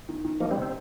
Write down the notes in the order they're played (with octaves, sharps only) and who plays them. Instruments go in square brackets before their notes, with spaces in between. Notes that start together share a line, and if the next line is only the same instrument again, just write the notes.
[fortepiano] D#3
D#3
[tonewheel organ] F3 A#3 [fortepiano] D#4
[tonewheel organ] G3 C4
[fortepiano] C3
[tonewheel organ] C4